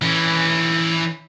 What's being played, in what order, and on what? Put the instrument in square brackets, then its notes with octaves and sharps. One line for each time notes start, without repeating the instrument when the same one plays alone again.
[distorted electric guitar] E3 C#4